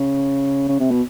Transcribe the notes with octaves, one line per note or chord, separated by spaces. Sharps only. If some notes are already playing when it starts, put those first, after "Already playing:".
Already playing: C#3
C#3
C3
B2